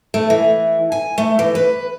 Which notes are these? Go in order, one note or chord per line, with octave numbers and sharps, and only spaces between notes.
A3
E3
G#5
A3
E3
B4